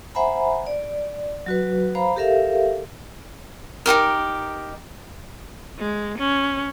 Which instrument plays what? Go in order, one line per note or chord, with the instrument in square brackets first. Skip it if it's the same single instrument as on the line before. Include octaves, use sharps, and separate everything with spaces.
[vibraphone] C5 E5 F#5 G#5 A#5 B5
D5
F#3 F#4 B4
C5 F5 A#5 B5
G4 A4 A#4 E5 F5
[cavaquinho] D#4 F#4 G4 A#4
[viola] G#3
C#4